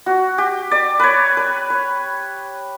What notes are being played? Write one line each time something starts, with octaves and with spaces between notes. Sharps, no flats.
F#4
G4
D5
B4 C#5
B4
C#5